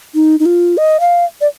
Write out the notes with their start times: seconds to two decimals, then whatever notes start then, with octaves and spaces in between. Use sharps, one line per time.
0.15 D#4
0.40 D#4
0.46 F4
0.77 D#5
1.00 F5
1.41 D5